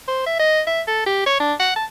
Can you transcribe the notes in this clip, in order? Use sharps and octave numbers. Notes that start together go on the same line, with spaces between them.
C5
E5
D#5
E5
A4
G4
C#5
D4
F#5
A5